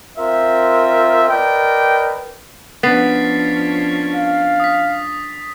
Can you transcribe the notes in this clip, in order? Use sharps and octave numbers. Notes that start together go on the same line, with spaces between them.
C4 F4 A#4 E5
A#4 B4 D5 D#5 G5
F3 B3 C#4 D4 A6 B6 C7
F5
D#6 B6